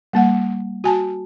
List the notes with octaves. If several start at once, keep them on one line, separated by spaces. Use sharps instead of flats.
G3 A#3 F#5
F#4 G#5 A5